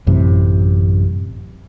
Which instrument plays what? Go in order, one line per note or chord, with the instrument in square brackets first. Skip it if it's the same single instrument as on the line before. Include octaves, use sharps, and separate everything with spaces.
[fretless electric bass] A1 F#2 A2 C3